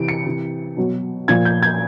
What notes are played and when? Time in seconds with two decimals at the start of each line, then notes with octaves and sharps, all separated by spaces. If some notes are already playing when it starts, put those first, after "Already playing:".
Already playing: C3 E3 D7
0.08 C#7
0.26 C3 E3
0.77 B2 F#3
1.28 A#2 F3 G#6
1.45 G6
1.63 G#6